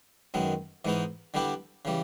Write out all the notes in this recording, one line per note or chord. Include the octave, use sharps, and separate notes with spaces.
F#2 D#3 G#3 B3
G#2 E3 G#3 B3 D#4
D3 G3 B3 E4 G4
C#3 E3 G3